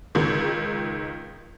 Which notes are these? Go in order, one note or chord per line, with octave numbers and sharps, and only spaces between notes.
C#2 D#3